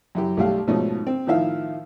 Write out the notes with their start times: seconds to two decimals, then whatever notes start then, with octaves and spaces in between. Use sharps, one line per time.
0.15 F#2 E4 G4
0.37 B1 G3 A3 G4 F5
0.67 G#2 B2 F3 A3 C#4 D#4
1.07 C4
1.27 A2 D#3 F3 E4 E5 F5